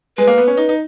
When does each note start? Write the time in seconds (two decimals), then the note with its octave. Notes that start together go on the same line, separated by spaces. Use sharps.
0.18 G#3 B4
0.27 A#3
0.38 B3
0.48 C#4
0.57 D#4
0.69 D#4